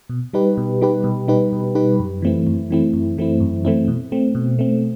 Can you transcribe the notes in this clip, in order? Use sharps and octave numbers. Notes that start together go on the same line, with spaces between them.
B2
G3 D#4 G4 B4
B2
G3 D#4 G4 B4
B2
G3 D#4 G4 B4
B2
G3 D#4 G4 B4
F#2
E3 A3 C4 E4
F#2
E3 A3 C4 E4
F#2
E3 A3 C4 E4
F#2
E3 A3 C4 E4
B2
A3 C4
B2
A3 C4